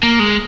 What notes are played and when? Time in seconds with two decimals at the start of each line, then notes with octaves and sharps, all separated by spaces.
0.03 A#3
0.20 G#3